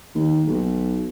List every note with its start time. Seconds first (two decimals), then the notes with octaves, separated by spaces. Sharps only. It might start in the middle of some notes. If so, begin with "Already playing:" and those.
0.15 D#2
0.47 B1